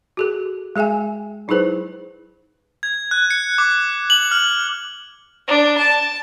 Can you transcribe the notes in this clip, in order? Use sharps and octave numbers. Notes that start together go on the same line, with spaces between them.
F#4 G#4 A4
G#3 G#4 E5 G5 G#5
F#3 D#4 E4 G#4 B4 C5
G#6
F#6
C#7
D6
F#7
F6
D4
A5